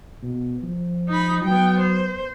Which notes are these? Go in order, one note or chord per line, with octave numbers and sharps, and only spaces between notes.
B2
F3
D#4 B5
F#3 B3 G5
C5